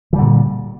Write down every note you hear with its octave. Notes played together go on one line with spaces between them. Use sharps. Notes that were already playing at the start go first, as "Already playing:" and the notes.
A#2 D3 E3 G3